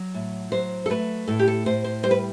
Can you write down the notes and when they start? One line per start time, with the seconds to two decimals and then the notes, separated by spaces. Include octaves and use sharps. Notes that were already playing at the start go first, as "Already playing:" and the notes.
Already playing: F#3
0.14 A2
0.52 F#3 C5
0.86 A4
0.90 A3 B4
1.28 A2 A4
1.39 G4
1.48 A4
1.66 A2 C5
1.84 C5
2.03 G3 C5
2.11 B4